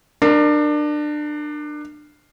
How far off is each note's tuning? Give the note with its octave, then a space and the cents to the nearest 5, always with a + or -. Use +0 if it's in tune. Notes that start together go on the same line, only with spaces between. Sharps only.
D4 +25 A#4 +0